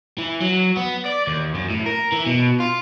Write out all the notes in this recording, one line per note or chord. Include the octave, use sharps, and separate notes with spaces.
E3
F#3
B3
D5
D#2
F#2
A2
A#4
E3
B2
F4